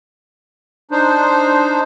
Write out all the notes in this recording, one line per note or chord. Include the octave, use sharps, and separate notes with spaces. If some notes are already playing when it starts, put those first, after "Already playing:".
D4 D#4 C5